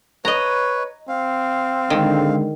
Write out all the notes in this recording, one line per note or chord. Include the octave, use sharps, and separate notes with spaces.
B4 C#5 D#5 A#5
C4 F5
D3 D#3 G#3